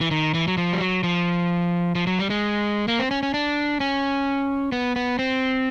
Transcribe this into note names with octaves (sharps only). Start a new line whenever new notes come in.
E3
D#3
E3
F#3
F3
G3
F#3
F3
F3
F#3
G3
G#3
A#3
C4
C#4
C#4
D4
C#4
B3
B3
C4